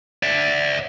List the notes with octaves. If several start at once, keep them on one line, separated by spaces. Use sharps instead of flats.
D5 E5